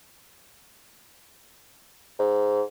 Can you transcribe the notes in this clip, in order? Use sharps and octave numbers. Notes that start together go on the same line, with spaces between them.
G#2